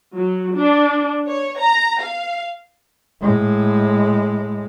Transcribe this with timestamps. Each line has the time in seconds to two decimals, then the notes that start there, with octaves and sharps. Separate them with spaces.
0.16 F#3
0.55 D4
1.28 C#5
1.60 A#5
2.03 F5
3.21 A2 G#3